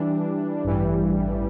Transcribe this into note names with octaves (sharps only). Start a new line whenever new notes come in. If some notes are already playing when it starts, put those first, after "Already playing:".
Already playing: E3 G3 D4
A1 G2 E3 G3